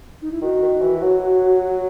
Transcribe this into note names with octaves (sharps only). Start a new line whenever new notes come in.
D#4
E4
D#3 F#4
D#3
E3
F#3